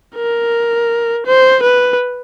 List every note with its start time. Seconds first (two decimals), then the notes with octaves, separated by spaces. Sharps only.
0.16 A#4
1.26 C5
1.63 B4